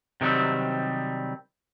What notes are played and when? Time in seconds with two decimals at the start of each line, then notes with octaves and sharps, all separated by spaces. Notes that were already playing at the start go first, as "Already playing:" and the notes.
0.21 C3 D#3 F#3 G3 C4